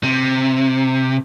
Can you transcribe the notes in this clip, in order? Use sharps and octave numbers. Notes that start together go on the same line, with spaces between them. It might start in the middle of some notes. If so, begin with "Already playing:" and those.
C3